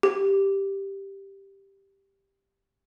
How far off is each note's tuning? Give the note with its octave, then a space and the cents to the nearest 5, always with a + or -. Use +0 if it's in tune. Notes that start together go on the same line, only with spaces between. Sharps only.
G4 +0